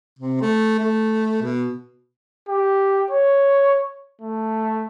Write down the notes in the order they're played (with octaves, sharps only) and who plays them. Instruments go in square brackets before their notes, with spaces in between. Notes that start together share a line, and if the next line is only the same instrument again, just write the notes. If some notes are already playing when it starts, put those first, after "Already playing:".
[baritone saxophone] C3
A3
A3
B2
[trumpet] G4
C#5
A3